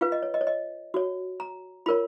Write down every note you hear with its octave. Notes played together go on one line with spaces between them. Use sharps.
F4 B4 F5
D#5
C#5
D#5
C#5
D#5
F#4 C#5
A#5
F4 A#4 C#5 B5